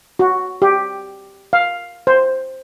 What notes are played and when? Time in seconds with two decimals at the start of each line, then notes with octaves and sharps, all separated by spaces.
0.19 F#4
0.62 G4
1.53 F5
2.07 C5